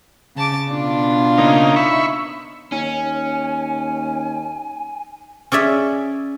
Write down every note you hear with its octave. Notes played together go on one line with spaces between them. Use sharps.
C#3 A5 D6
B2 D4 F4
C#3 A#3 D#4
E5 B5 C#6
D#2 C#4 G#5
C#4 G#4 D5 E5